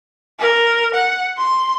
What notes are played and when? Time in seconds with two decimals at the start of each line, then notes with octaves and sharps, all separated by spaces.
0.40 A#4
0.94 F#5
1.38 C6